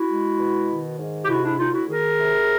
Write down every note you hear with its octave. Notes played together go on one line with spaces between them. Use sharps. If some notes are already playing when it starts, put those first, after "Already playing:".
Already playing: E4 F#4
G#3
B2
D#3
G#2
G4
C3 E4 F#4
D4 E4
D2 D#4 F4
E4 F#4
D#3 G#4 A#4
C3